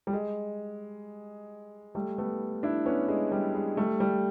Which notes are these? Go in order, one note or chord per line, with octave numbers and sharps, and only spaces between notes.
G3
G#3
G3 A3
A3 B3
D4 E4
B3 C#4
G#3
G3
G#3
G3 A3
G3